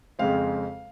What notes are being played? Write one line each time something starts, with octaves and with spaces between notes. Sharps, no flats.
F2 C#3 G#3 C4 F5